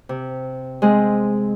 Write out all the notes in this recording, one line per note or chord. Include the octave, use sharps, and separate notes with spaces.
C3
G#3 C4 G#4